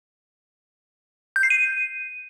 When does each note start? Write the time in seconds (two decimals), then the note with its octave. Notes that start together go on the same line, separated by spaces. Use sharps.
1.36 G6
1.43 C7
1.50 D#7